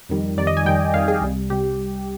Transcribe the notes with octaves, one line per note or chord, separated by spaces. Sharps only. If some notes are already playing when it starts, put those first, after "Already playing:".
F2 D#3 G3
F2 D#3 G3 D5
D#5
G#5
F2 D#3 G3 G5
F2 D#3 G3 F5
G#4
C2 C3 G3
C3 G3 G4